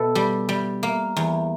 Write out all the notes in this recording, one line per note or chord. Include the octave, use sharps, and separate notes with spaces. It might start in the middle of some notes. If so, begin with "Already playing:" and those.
Already playing: B2 A4
G3
G3
A#3
E2